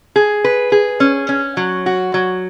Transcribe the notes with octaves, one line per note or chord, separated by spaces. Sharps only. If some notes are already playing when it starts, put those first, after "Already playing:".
G#4
B4
G#4
C#4
C#4
F#3
F#4
F#3